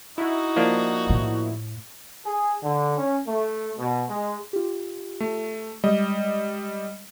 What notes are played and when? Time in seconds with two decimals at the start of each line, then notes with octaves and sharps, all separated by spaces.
0.18 D#4 E4 F#4
0.56 F3 A#3 D4
1.10 A2
2.24 G#4
2.62 D3
2.97 C#4
3.26 A3
3.78 B2
4.09 G#3
4.53 F4 G4
5.21 A3
5.84 G3 G#3 D#5